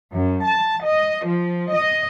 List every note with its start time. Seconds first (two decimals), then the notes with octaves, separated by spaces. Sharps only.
0.12 F#2
0.43 A5
0.84 D#5
1.24 F3
1.72 D#5